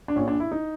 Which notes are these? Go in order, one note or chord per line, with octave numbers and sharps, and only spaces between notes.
D4
A#1 A#2 C#4
D4
E4
D#4